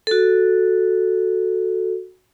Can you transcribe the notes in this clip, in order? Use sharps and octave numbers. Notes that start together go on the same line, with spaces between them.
F#4 A4